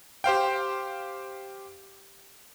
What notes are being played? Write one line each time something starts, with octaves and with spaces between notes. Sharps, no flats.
G4 C5 F5 G5